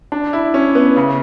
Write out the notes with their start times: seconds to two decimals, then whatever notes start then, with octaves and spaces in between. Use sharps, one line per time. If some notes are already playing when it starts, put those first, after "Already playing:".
0.12 D4
0.33 E4
0.54 C#4
0.75 B3
0.96 C#3